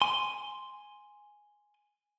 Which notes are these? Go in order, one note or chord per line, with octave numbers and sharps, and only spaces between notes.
G#5 C6